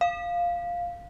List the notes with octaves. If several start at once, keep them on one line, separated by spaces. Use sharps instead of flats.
F5